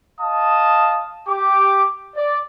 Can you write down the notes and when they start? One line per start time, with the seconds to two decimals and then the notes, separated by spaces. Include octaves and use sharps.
0.19 D#5 F5 A5 D#6
1.27 G4 D6
2.15 D5